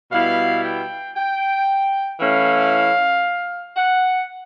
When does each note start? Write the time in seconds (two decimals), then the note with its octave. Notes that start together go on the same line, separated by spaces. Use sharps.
0.12 B2 G3 B3 E4 F5
0.64 G5
1.17 G5
2.20 E3 A3 C#4 E4 F5
3.76 F#5